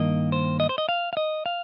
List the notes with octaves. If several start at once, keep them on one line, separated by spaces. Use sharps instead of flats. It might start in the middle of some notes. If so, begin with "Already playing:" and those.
Already playing: G2 D#3 A#3 D#5
C5
D#5
C5
D#5
F5
F5
D#5
F5